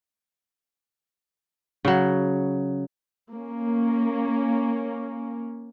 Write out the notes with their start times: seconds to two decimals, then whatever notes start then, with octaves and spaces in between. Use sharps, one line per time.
1.85 C#3 F#3
3.33 A#3 C#4